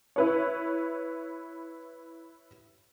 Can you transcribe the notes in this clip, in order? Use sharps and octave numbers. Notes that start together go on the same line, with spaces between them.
E4 B4 C#5